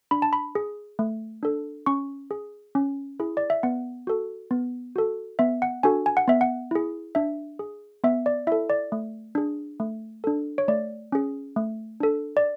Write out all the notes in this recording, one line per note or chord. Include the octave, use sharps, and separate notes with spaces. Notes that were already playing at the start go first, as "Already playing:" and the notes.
D4 B5
A5
B5
G#4
A3
D4 A4
C#4 C#6
G#4
C#4
E4 G#4
D5
E5
B3 F#5
F#4 A4
B3
F#4 A4
B3 E5
F#5
D4 F#4 A4 G#5
G#5
F#5
B3 E5
F#5
E4 G#4
D4 E5
G#4
B3 E5
D5
E4 A4 E5
D5
A3
D4 G#4
A3
D4 A4
C#5
A3 D5
C#4 G#4
A3
D4 A4
D5